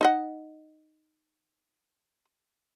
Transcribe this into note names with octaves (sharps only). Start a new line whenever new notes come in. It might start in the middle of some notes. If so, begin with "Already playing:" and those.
D#4 D#5 F#5